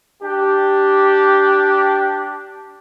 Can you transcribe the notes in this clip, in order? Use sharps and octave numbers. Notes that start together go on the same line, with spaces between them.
D4 G4